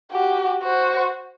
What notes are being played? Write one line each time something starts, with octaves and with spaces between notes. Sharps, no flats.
F#4 G4
F#4 C5